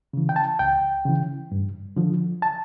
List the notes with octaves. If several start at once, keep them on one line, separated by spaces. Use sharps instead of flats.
C#3 E3
G5
A5
C#2 G5
C#3 E3
G2
D3 F3
A5